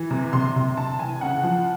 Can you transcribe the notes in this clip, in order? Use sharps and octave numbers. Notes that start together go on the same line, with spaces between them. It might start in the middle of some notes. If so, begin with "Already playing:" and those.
Already playing: E3
C3
C3 C6
C3
C3 A5
E3 G#5
C#3 F#5
F3